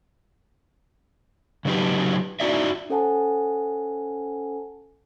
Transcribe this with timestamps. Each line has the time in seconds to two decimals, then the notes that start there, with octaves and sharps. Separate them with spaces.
1.65 C#3 F#3 D#4 G4 B4
2.40 D#4 E4 F#4 D5 E5
2.90 C#4 A4 C5 F#5 G#5 A5